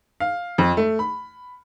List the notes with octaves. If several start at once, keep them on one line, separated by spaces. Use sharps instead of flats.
F5
F2
A3
B5